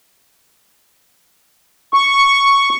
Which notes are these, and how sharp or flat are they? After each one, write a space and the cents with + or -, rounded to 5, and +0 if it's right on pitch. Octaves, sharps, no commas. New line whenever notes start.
C#6 +0